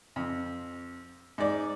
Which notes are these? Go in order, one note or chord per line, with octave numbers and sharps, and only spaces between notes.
F2
G#2 D5